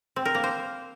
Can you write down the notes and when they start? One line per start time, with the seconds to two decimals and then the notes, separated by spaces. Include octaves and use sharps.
0.16 C4
0.25 A#4
0.34 A#3
0.44 C5